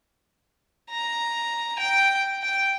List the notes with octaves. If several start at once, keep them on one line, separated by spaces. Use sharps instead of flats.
A#5
G5
G5